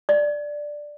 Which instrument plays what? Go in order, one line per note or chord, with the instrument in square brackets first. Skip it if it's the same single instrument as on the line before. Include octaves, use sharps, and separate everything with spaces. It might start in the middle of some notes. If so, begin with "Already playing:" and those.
[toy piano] D5